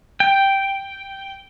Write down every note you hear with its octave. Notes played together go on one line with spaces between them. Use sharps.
G5